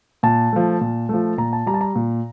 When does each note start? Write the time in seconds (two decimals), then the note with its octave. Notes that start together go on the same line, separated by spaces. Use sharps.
0.23 A#2 A5
0.53 F3 A3
0.81 A#2
1.09 F3 A3
1.38 A#2 A#5
1.53 A5
1.66 G3 A#5
1.74 A5
1.81 A#5
1.95 A#2